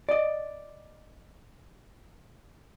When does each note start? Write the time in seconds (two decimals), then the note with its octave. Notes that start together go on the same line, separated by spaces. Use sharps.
0.09 D5 D#5